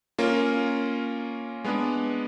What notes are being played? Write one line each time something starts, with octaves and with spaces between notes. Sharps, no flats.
A#3 C#4 F4 A#4
G#3 B3 D4